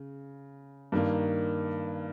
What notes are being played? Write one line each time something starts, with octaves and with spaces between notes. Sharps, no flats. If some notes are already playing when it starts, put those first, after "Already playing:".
Already playing: C#3
G2 D#3 A#3